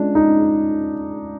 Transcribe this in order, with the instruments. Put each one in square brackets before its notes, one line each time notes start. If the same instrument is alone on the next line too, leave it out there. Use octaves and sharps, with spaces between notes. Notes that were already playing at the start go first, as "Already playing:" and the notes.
Already playing: [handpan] G#3 C#4 F4 [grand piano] D4
[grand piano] D#4